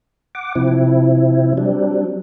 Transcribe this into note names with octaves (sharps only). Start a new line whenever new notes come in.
F#5 D6
C3 F3 C4 E4
F#3 G3 C4 D4